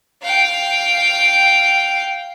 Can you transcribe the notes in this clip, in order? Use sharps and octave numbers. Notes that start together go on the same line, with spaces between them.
F5 G5